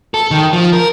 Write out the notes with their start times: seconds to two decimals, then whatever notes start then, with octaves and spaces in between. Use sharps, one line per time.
0.14 A4
0.31 D#3
0.53 F3
0.73 A#4